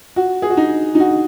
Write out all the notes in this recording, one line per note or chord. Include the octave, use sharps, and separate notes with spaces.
F#4
G#4
F#4
D#4
D#4
F#4